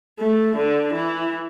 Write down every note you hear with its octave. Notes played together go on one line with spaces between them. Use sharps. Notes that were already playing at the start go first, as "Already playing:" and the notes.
A3
D3
E3